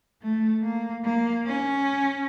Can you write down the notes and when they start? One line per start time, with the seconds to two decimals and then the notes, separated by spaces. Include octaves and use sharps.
0.22 A3
0.63 A#3
1.04 A#3
1.46 C#4